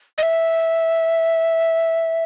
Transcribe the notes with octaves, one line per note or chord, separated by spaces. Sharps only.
D#5
E5